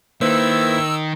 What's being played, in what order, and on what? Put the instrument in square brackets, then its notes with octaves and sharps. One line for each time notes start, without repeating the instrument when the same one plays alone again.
[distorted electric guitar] D#3 [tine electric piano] A#3 B4 C5 [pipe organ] E4 [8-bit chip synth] E6